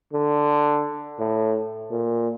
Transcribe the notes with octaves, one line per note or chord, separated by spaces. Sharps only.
D3
A2
A#2